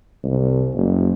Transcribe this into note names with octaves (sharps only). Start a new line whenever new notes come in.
C2
F#1